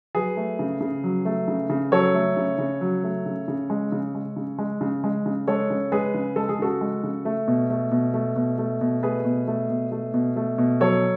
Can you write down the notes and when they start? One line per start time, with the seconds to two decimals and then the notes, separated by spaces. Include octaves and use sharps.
0.15 F#3 G#4 B4
0.37 A3
0.59 C#3
0.81 C#3
1.04 F#3
1.25 A3
1.48 C#3
1.70 C#3
1.92 F#3 A4 C#5
2.14 A3
2.37 C#3
2.59 C#3
2.81 F#3
3.04 A3
3.26 C#3
3.48 C#3
3.70 G#3
3.92 C#3
4.15 G#3
4.36 C#3
4.58 G#3
4.81 C#3
5.04 G#3
5.26 C#3
5.48 G#3 A4 C#5
5.70 C#3
5.92 G#3 G#4 B4
6.14 C#3
6.36 G#3 A4
6.49 G#4
6.59 C#3 F#4 A4
6.81 G#3
7.04 C#3
7.25 A3
7.48 B2
7.70 A3
7.91 B2
8.14 A3
8.36 B2
8.58 A3
8.81 B2
9.03 A3 G#4 B4
9.25 B2
9.47 A3
9.70 B2
9.92 A3
10.14 B2
10.36 A3
10.58 B2
10.80 F#3 A4 C#5